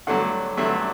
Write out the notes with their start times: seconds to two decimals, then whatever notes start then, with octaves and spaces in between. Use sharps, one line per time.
0.07 G2 D3 F#3 A3 F#5
0.57 G2 D3 F#3 A3 E5